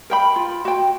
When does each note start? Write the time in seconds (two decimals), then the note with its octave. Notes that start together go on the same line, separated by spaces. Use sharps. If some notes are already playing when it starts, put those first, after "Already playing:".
0.10 A#4 G5 B5
0.36 F4
0.65 F#4 G5